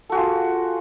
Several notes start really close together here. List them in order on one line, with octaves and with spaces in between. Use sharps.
A4 F#4 G#4 F4